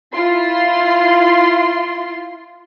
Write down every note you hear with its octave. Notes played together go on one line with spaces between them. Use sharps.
E4 F4 C6